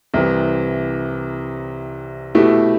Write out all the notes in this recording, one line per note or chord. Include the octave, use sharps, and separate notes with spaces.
C2 C3 E3
B2 A3 E4 G4